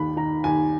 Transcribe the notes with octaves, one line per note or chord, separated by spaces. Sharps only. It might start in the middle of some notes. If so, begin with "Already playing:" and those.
Already playing: D#2 D#3 B5
D#3 A#5
D#2 G#5